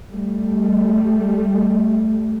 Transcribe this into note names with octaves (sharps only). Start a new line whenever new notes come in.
G3 A3